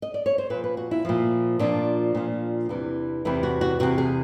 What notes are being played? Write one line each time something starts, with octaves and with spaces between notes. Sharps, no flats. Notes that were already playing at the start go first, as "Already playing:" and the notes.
D#5
D5
C#5
C5
A#2 F3 B4
B4
F#4
E4
A#2 F3
A#2 F3 D4
A#2 F3
E2 C3 E3
E2 C3 E3 E4
F#4
F#4
E2 C3 E3 F#4
G#4